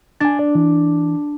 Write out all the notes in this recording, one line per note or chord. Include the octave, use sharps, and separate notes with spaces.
D4 G#5 A6
D5
E3